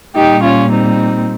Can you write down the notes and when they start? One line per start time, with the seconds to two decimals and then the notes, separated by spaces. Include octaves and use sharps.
0.15 A#2 G3 D#4 G4
0.44 C#4 F4
0.72 C4 D#4